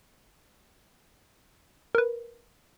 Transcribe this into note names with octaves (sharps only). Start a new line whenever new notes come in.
A#4 B4